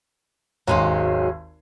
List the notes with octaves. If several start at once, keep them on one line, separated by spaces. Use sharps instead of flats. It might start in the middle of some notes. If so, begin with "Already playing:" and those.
G#1 D#2 F#3 G#3 C#4 C6